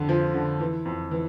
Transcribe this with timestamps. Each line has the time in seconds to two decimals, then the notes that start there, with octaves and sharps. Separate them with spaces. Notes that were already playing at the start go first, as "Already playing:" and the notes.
Already playing: F2 D3
0.09 F3
0.34 D3
0.60 E3
0.85 F2
1.11 E3